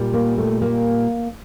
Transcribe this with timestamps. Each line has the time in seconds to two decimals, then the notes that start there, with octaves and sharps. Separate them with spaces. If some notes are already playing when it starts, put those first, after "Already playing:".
Already playing: A#2 G3
0.14 A#3
0.38 A3
0.62 A#3